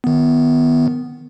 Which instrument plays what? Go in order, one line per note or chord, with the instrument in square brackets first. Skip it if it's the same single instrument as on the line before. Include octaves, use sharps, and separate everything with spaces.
[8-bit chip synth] D#3 B3